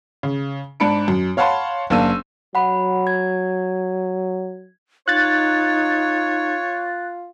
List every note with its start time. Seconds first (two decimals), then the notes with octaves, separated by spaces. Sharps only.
0.23 C#3
0.80 G#2 D4 B5 C#7 D7
1.08 F#2
1.37 C#5 F5 F#5 A5 B5 C6
1.90 F#1 A#3 D4 E6 D#7
2.55 F#3 F#5 B5
3.07 G#6
5.08 D#4 F4 C#5 F#6 A6